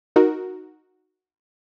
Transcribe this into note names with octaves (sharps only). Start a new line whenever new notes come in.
D#4 F#4 A#4